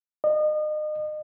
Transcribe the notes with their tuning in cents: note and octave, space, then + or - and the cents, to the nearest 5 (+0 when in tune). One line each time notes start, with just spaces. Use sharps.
D#5 -35